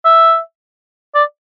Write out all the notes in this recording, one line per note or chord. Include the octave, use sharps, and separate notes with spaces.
E5
D5